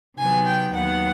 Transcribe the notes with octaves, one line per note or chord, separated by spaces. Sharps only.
C3 D#3 F#3 B3 G#5
G5
D#2 D#3 F#3 B3 F#5